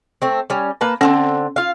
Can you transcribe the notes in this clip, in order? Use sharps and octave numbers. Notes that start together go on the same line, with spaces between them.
A3 C4
G3 C#4
A#3 B4 A5
D3 G3 C4 C#4
F4 F5